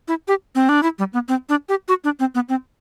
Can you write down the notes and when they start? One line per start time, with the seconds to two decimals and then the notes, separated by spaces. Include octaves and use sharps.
0.08 E4
0.28 G4
0.55 C4
0.69 D4
0.83 E4
0.99 G3
1.13 B3
1.28 C4
1.49 D4
1.69 G4
1.88 F#4
2.04 D4
2.20 C4
2.35 B3
2.49 C4